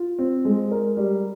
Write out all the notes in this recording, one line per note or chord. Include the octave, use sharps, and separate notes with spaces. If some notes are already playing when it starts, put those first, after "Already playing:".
Already playing: F4
C4
G#3
A#4
G3